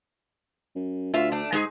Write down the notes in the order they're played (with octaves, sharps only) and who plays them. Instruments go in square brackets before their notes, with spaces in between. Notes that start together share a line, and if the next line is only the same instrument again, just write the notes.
[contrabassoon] F#2
[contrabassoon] D2 [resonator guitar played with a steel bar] F4 E5
[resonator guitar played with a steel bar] A3 D4
[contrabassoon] G#2 [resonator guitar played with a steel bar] G#3 D#4 G#4